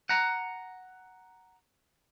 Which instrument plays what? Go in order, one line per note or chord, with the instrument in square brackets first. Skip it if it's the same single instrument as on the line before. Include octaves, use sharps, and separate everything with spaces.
[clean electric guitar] F#5 A#5